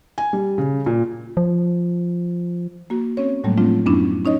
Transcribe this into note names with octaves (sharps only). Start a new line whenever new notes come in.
G#5
G3
C#3
A#2
F3
A#3 F#4
C4 C#4 C#5
A2 F#3 G3 A3 A#3
F3 A3 C4 D4 F4
F#2 F#3 B3 C#4 D4 E4
C#4 D#4 C#5 D#5